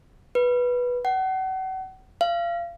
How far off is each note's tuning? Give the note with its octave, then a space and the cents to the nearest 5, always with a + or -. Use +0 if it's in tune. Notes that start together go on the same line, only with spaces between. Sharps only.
B4 -10
F#5 +35
F5 -30